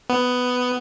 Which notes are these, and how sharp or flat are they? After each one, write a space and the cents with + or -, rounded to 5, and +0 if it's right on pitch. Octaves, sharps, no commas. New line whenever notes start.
B3 +10